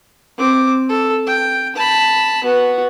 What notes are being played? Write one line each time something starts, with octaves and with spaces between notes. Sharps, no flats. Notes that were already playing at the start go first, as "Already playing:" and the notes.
C4 D6
A4
G5
A5 B5
B3 F#4